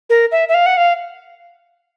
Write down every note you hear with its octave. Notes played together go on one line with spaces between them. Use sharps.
A#4
E5
E5
F5
F#5
F5